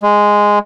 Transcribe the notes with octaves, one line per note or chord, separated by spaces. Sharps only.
G#3